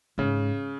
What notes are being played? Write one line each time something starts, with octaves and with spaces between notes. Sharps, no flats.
G#2 C#3